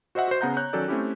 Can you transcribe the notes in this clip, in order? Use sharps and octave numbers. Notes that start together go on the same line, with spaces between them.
F#4 C5 D#5 E5 F#5
F#4 C5
C#3 B3 F#5 A#5 G6
C#5 A#5 F#6 G6
D#3 F#3 C#4 A4 A#4 D5
A3 C4 C#4 E4 G4